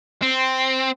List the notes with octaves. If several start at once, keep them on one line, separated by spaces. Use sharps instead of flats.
C4